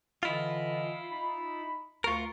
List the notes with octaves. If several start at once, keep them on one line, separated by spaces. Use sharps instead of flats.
D3 E3 E4 F4 D#5
D#4 B5
D2 F4 A#4 C#6